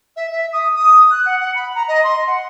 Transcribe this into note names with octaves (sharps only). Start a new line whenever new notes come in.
E5
E5
D#6
D#6
F#6
F#5
F#5
B5
A#5
D#5
C6
F#5